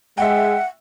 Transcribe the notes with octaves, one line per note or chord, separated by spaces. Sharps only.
G#3 E5 F#5 G5